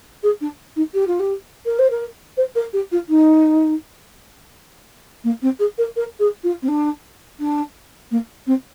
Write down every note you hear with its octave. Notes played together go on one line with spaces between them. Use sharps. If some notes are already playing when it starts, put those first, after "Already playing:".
G#4
D4
D#4
G4
F4
G4
A#4
C5
A#4
C5
A#4
G4
F4
D#4
A#3
C4
G#4
A#4
A#4
G#4
F4
C4
D4
D4
A#3
C4